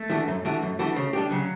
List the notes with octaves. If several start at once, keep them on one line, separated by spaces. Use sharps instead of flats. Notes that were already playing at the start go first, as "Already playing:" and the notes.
Already playing: A3
E3 G3 D4 F#4
F#2
E3 G3 D4 F#4
F#2
E3 G3 D4 F#4
C#3
G3 D4 G4
C#3 F#3